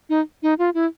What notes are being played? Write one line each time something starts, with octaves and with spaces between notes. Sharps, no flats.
D#4
D#4
F4
E4